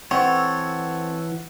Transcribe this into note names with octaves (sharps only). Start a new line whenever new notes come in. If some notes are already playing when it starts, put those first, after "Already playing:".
E3 C4 A4 C#5 F#5